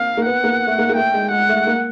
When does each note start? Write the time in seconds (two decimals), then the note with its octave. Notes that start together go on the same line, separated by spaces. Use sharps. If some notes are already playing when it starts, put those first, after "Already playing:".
Already playing: A#3 C4 F5
0.17 A#3
0.25 B3 F#5
0.44 A#3
0.67 A3
0.78 A#3
0.89 A#3
0.96 A3 G5
1.14 G#3
1.31 G#3 F#5
1.49 A3
1.67 A#3